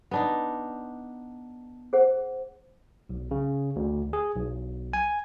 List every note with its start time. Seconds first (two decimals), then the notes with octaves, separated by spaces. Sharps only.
0.11 B3 D4 D#4
1.93 G#4 C5 F#5
3.09 B1
3.31 C#3
3.76 D2
4.13 G#4
4.36 B1
4.93 G#5